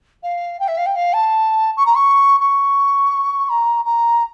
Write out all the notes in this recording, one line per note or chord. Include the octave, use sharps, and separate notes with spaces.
F5
G5
E5
F5
G5
F5
A5
C#6
A#5
C#6
C#6
A#5
A#5